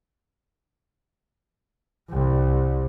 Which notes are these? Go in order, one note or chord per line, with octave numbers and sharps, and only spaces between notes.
C2